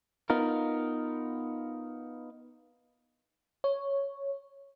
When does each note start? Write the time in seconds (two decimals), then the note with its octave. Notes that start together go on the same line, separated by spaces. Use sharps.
0.30 B3 D#4 F4 A#4
3.64 C#5